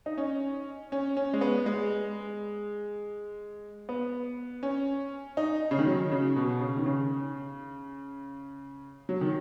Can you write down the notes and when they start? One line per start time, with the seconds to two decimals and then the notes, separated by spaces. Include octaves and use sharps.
0.06 D#4
0.18 C#4
0.92 C#4
1.17 C#4
1.34 G#3
1.41 B3
1.66 G#3
3.89 B3
4.63 C#4
5.37 D#4
5.71 C#3
5.79 D#3
5.87 F#3
6.12 C#3
6.36 B2
6.60 C#3
6.77 D#3
6.86 C#3
9.09 F#3
9.21 D#3